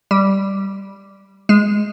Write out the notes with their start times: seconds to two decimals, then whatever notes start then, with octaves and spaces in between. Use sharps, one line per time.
0.11 G3
1.49 G#3